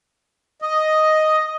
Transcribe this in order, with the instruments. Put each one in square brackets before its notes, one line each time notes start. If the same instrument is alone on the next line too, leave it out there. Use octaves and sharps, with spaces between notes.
[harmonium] D#5